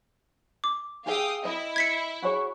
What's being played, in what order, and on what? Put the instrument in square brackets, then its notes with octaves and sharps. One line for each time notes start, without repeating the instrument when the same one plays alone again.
[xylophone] D6
[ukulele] G4 G#4 E5 [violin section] F5 G5 D#6
[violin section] E4 [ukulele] D#5
[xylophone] G#6 B6 C#7
[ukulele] F#4 G#4 C#5